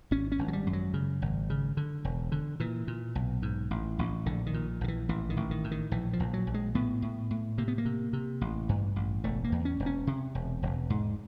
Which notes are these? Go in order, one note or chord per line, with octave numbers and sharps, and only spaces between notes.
G#1 C#4
C#4
G#1
F#3
G3
F#2
F#3
C#3
G#1
C#3
D3
E1
D3
A#2 E3
A#2
B1
G#2
A1
A1
A#1 D3
D#3
A#2
A#1 D#3
E3
A1 E3
D#3
A1
D#3
A2
D#3
A#1 E3
F3
A#1
F#3
A#1
G#3
A2 B3
A2
A2
C3 A#3
B3
A#3
C3
C3
A1
G2
A1
E1 A3
A#3
E2
C#4
E1
C#4
C3
E1
E1
G#2